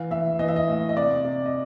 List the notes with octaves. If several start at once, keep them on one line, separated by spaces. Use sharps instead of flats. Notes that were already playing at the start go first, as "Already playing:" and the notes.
Already playing: E3 F5
E3 E5
E3 D#5
E5
D#5
A2
D#5
C3 D5
C3
D#5